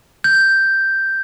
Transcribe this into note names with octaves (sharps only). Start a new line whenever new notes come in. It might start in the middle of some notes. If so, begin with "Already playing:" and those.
G6